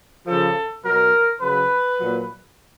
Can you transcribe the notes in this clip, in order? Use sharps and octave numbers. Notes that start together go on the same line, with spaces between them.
C#3 F3 A4
B2 F#3 A#4
C#3 F#3 B4
A#2 F#3